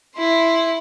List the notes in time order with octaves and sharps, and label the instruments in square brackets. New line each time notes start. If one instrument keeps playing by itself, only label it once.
[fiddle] E4 C6